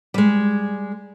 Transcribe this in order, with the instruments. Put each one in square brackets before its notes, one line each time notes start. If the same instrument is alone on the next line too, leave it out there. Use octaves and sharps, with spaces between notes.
[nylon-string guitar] G3 G#3